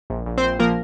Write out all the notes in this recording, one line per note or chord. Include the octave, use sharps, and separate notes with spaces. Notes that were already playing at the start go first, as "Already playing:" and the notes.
A#1
A#1
C4 C5
A#1
F3 A#3 A#4